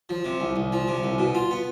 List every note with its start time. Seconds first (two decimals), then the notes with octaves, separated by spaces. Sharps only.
0.09 F3
0.25 C3
0.40 C2
0.56 C2
0.72 F3
0.88 C3
1.04 C2
1.19 B2
1.35 F4
1.51 B3